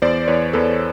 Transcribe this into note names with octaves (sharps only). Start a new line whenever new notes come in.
E2 C5 D5
E2 B4 C#5
E2 A4 B4